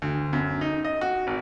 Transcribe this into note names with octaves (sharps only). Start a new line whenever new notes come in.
D2
F#2
D#4
D#5
F#4
G#1